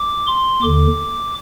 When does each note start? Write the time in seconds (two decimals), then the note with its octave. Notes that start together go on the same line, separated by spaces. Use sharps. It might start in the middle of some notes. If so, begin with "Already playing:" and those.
Already playing: D6
0.27 C6
0.62 D#2 D3 D6